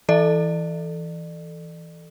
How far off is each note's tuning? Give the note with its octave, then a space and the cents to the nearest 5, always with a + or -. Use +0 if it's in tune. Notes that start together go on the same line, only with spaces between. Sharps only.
E3 +0 A4 +0 D5 +35